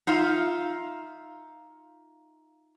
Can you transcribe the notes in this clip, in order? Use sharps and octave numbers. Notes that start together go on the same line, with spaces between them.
D#4 F4 E5 F5